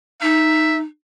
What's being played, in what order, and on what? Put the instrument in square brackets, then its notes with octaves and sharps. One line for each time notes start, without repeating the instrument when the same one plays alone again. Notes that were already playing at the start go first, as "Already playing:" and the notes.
[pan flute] D#4 [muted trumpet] E5